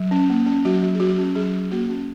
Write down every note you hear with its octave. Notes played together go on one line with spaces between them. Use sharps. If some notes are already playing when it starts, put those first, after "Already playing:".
Already playing: F#3
C#4
A#3
C#4
F#3 F#4
F#3
G#4
F#3 F#4
C#4
F#3 G#4
F#3
A#3 F#4
C#4